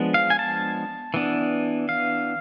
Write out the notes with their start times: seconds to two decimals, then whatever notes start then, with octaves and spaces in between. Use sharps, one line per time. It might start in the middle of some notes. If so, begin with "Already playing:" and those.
Already playing: F3 G#3 B3 D4
0.14 F5
0.30 G#5
0.39 A5
1.14 E3 B3 D4
1.89 F5